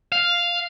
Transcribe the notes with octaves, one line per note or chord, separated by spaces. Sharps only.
F5